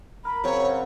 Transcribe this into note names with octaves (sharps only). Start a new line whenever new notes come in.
A#4 B5
C#3 F#3 C4 C#5